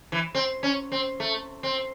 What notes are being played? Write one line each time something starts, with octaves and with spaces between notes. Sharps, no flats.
E3
C4
C#4
C4
A3
C4